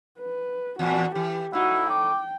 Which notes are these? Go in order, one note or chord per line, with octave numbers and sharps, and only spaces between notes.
B4
E2 A#2 F#4
E3 G4
A2 D#4 E4 F#4
G5 D6